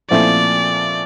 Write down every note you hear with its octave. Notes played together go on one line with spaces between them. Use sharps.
A#2 F3 A3 C4 E4 D5